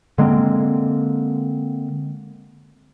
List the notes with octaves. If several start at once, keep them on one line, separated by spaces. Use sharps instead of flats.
D3 G#3 A#3 C4